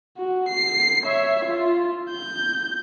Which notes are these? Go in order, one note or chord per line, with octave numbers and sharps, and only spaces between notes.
F#4
C7
C#5 E5
F4
G6